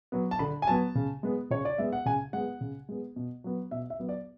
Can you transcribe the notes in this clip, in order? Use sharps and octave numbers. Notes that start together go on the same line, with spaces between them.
F#3 B3
A5
D3 B5
G#5
F#3 B3 A5
C#3
G#3 B3
C#3 C#5
D5
G#3 B3 E5
F#5
C#3 G#5
G#3 B3 F#5
C#3
G#3 B3
B2
F#3 B3
B2 E5
E5
F#3 B3
D5